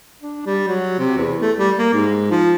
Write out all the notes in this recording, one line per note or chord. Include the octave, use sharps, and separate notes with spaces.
D4
G3
F#3
C3
E2
A3
G3
A#3
G#2
F3